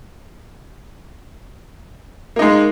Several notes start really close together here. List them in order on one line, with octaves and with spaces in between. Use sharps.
A#3 D#4 G#3